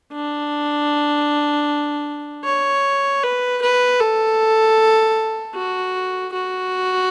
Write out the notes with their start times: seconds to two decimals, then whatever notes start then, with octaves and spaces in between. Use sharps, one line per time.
0.13 D4
2.44 C#5
3.23 B4
3.62 B4
4.00 A4
5.55 F#4
6.33 F#4